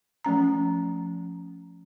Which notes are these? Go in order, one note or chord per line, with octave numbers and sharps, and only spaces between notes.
F3 A3 C#4 A#5